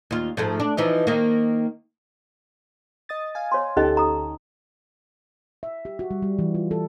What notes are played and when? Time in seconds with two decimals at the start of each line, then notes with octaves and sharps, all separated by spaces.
0.11 D#2 F4
0.37 G#2 F3 A3
0.60 D4
0.77 E3 F3 D#4
1.07 D#3 A#3
3.09 D#5 D#6 A6
3.35 F5 G#5
3.52 C#5 C6
3.77 D2 C#4 D#4 G4 A4 D#5
3.97 A#5 D#6
5.63 E5
5.85 G4
5.99 F#4
6.11 G3
6.22 G3
6.39 E3
6.55 F4
6.71 A4